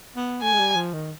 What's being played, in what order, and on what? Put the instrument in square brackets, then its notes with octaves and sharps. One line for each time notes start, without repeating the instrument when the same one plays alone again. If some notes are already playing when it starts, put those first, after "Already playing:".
[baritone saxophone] B3
[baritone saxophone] A3 [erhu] G#5
[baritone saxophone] G#3
G3
F3
D#3